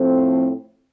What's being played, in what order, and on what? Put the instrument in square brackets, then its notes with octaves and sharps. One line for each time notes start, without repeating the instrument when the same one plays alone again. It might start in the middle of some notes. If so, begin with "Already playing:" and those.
Already playing: [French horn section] A2 F3 A3 C4